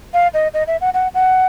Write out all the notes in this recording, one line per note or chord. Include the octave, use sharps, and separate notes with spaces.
F5
D#5
D#5
E5
F#5
F#5
F#5